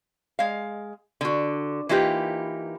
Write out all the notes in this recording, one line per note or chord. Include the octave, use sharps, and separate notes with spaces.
G#3 F5
D3 F#4
E3 A#3 D#4 F4 G4 B4